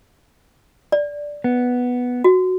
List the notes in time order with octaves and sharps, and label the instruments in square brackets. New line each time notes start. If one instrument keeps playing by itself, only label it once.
[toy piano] D5
[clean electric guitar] B3
[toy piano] F#4